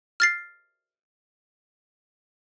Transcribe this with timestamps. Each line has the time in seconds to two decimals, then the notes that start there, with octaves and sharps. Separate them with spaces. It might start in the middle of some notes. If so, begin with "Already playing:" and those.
0.20 F6 A6 C7